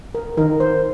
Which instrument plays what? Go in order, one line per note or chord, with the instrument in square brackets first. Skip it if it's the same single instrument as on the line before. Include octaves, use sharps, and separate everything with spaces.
[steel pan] A#4
[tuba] D#3 [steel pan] A#4
[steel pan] C5